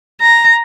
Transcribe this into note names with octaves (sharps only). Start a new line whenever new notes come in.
A#5